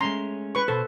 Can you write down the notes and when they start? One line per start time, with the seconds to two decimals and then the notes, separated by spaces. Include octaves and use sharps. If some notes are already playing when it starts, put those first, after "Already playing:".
0.01 G#3 A3 C#4 A#5 C6
0.55 B4 C#6
0.68 B2 A4 C5